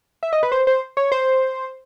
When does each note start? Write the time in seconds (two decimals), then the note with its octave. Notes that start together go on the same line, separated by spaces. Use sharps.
0.23 E5
0.33 D#5
0.43 B4
0.52 C5
0.67 C5
0.97 C#5
1.12 C5